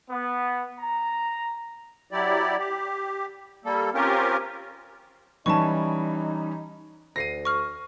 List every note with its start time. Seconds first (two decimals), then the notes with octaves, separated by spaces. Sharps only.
0.11 B3
0.80 A#5
2.11 F#3 E4 G4 D5
2.59 G4
3.65 G3 A#3 A4
3.94 C4 C#4 F4 G4 A#4
5.46 E3 G3 C#4 D#4 A5 C#6
7.16 D2 A#6 C7 D#7
7.45 C#6 F6